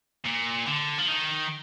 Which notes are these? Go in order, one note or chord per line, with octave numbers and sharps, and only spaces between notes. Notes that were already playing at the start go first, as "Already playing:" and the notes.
A#2
D3
F3
D#3